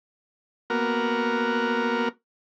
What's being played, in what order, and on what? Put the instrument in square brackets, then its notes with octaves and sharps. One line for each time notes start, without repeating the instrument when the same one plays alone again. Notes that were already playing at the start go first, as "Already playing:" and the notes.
[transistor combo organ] A#3 B3 F#4 A#4